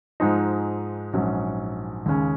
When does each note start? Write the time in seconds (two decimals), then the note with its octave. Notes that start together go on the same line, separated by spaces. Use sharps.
0.20 G#2 F3 G#3 D#4
1.13 A#1 G#2 F#3 C#4
2.06 D#2 C#3 G#3 C#4